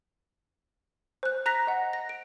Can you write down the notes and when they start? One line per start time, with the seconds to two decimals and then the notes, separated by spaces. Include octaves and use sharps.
1.23 C5 F#6
1.46 A#5 F#6 A#6 B6
1.67 D#5 F#5
1.93 A#6
2.09 D7